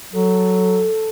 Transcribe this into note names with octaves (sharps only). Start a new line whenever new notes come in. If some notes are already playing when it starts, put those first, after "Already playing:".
F#3 A4